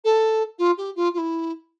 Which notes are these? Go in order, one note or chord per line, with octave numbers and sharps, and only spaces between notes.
A4
F4
G4
F4
F4
E4